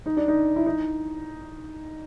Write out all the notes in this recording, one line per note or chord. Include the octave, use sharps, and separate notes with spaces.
D#4
D4
D#4
E4
D#4